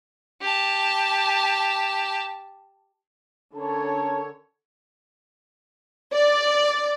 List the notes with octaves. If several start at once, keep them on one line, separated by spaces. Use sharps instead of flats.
G4 A5
D3 C#4 A#4 C#5 A5
D5